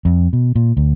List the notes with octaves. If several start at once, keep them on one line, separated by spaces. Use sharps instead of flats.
F2
B2
A#2
D2